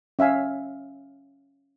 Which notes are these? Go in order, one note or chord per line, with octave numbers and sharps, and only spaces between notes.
C#4 E5 F5 G#5